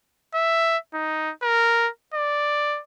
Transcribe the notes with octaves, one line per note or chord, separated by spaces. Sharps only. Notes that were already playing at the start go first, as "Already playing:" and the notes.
E5
D#4
A#4
D5